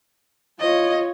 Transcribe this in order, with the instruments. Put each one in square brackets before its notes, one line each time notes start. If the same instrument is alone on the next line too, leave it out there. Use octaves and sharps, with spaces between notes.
[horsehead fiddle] F4 C#5 [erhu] D#5